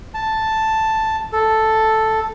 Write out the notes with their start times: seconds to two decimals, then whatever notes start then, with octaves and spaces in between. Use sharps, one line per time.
0.14 A5
1.33 A4